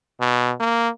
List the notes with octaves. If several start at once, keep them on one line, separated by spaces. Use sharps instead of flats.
B2
A#3